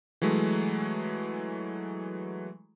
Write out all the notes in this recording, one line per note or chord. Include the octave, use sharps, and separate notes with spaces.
E3 F#3 G#3 A3